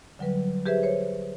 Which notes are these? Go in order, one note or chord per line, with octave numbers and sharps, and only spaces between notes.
D3 F#3 G3 B4
G4 G#4 B4 C5 E5
C5 C#5